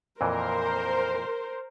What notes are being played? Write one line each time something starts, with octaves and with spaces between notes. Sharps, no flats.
F2 A#2 E3 A#4 C5